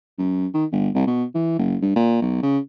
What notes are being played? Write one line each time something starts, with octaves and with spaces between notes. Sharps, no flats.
F#2
D#3
G1
C2
B2
E3
F#1
G2
A#2
B1
C#3